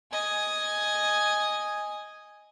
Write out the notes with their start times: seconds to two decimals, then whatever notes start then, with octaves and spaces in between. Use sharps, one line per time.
0.11 D#5 G#5